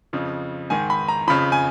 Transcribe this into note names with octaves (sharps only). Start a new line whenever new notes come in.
F2 C#3 F3
G#2 D#3 G#5
B5
A#5
F2 C#3 F3 B5
G#5